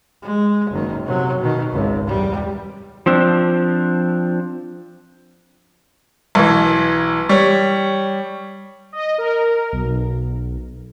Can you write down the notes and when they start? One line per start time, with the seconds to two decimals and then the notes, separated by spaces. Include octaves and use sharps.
0.22 G#3
0.71 F#1 D#3
1.05 C3 F#3
1.41 B2 D#3
1.72 G#1 C#2
2.07 E2 G3
3.06 F3 C4 D4
6.35 B1 E3
7.29 G3 C#5
8.93 D#5
9.18 A#4
9.72 B1